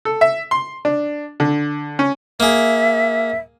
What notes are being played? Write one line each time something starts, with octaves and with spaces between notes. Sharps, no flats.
A4
E5
C6
D4
D3
C#4
A#3 G#4 E5